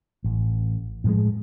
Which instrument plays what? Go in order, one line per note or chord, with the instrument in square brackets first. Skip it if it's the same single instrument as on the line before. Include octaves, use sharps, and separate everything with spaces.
[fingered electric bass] A1
A2 F3 G#3